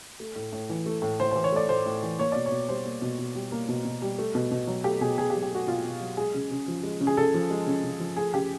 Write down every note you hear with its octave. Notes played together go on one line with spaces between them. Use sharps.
A3
A2
A2
E3
A3
A2
A2 C5
E3 C5
C#5
A3 D5
A2 C5
A2
E3
A#3 C#5
B2 D5
C#5
B2
G3 C5
A#3
B2
B2
G3
A#3
B2
B2
G3
A3
B2
B2
F#3
A3 G4
B2 G#4
B2 G#4
G4
F#3
G4
A3 F#4
B2 F4
B2
F#3
G#3 G#4
C#3
C#3
F3
G#3
C#3
G#4
C#3 A4
F3
G#3
C#3
C#3
F3
A3 G#4
C#3 G4